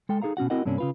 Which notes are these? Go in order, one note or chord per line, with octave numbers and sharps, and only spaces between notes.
G#3 A4 G5
D#4 G#4 A4 F5 A#5
B2 C#4 F#4 F#5
C4 E4 F#4 A#4 D#5 F#5
G2 C3 A#3 C#4 D4
C#3 F4 B4